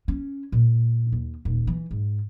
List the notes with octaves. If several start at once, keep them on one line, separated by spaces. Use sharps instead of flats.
C#4
A#2
D#2
D#1
E3
G#2